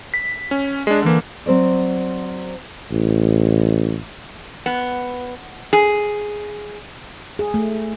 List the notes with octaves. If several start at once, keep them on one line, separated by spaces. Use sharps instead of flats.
B6
C#4
G#3 D4
D3 E3 A#3
F#3 C4 C5 D5
A1
B3
G#4
G#4
A3